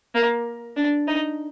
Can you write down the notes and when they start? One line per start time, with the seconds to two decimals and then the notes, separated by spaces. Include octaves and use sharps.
0.15 A#3
0.77 D4
1.08 D#4